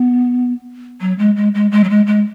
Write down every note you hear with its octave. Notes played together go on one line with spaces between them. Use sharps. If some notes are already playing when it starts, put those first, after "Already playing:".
Already playing: B3
F#3
G#3
G#3
G#3
G#3
F#3
G#3
G#3